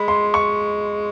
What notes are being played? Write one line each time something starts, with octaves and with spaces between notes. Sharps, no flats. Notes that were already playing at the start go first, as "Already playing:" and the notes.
Already playing: G#3 B5
C6
C#6